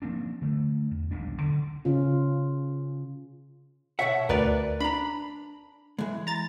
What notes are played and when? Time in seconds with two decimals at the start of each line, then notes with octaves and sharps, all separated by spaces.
0.02 F3 A#3 C4 D4
0.41 D3 A3
0.91 E2
1.11 D#1 B1 G#3 D4
1.42 D3
1.85 C#3 C#4 F4
3.99 B2 C#5 E5 F#5
4.29 D2 A#4 B4 D5
4.80 D4 A#5 B5
5.99 E3 G#3
6.27 A#5 A6